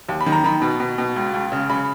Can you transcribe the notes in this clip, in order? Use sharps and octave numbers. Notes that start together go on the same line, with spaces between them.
D#2
B5
D#3
A#5
D#3 B5
B2
B2
B2
C#2
C#2
C#3
C#3 B5